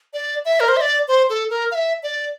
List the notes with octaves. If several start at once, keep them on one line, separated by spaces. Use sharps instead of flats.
D5
E5
A#4
C5
E5
D5
C5
A4
A#4
F5
E5
D5